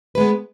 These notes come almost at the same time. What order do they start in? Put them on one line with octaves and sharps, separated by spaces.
B4 G#3 B3